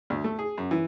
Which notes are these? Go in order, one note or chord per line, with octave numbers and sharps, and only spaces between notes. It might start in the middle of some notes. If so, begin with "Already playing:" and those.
D2
A3
G#4
F#2
E3